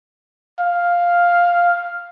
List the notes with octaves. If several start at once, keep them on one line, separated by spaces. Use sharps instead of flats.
F5